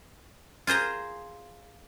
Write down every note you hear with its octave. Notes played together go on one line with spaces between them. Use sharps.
F4 G#4 C5 A#5